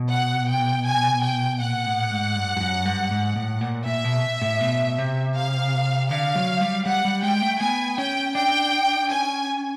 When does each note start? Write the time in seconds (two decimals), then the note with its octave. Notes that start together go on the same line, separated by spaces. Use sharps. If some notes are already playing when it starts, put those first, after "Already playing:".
Already playing: B2
0.11 F#5
0.49 G5
0.86 G#5
1.23 G5
1.61 A#2 F#5
1.86 A2
2.11 G#2
2.36 G2
2.57 G2
2.60 F#2
2.85 G2
3.11 G#2
3.36 A2
3.61 A#2
3.85 A#2 E5
4.04 B2
4.42 A2
4.61 B2
4.98 C3
5.36 F5
6.11 D3 F5
6.35 F#3
6.61 G3
6.86 G3 F#5
7.05 G3
7.23 G#3 G5
7.42 A3
7.60 B3 G#5
7.98 C#4 G5
8.35 D4 G5
9.11 C#4 G#5